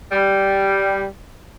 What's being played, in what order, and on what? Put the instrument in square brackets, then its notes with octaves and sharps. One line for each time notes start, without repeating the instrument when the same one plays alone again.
[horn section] G3